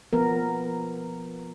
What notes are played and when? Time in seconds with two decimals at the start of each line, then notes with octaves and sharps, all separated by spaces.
0.13 F3 B3 A#4